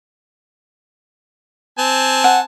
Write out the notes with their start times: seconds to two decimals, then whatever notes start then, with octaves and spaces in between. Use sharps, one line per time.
1.78 C4 G#5 A5
2.24 F#5